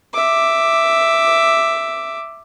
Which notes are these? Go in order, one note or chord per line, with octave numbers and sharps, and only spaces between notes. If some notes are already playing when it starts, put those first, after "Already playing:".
E5 D6